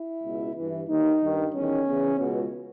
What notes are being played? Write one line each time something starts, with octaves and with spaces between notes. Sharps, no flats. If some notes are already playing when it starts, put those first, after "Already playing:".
Already playing: E4
C#2 B2
G2 E3
D#2 D#3 D#4
G2 D#3
E2 D#3 C#4
E2 C#3 E3
C#2 B2